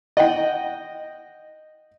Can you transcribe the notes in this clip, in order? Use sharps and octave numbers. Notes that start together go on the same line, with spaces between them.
D#5 F#5 G5